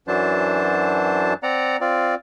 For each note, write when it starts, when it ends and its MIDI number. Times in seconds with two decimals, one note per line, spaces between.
0.08 1.34 42
0.08 1.34 52
0.08 1.34 54
0.08 1.34 62
0.08 1.34 72
0.08 1.34 81
1.43 1.77 60
1.43 1.77 74
1.43 1.77 78
1.43 1.77 82
1.81 2.15 60
1.81 2.15 65
1.81 2.15 74